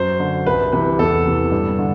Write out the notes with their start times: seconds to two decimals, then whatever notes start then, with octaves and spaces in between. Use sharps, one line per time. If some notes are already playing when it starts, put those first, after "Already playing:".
Already playing: F#2 C5
0.20 D3
0.46 C2 B4
0.72 C3 E3 B4
0.98 E2 A4
1.26 C3 E3
1.52 G2
1.79 D3